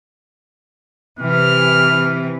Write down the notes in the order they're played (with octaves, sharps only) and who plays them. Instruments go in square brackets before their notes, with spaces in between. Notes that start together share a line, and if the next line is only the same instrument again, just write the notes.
[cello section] C3 E3 [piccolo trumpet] F6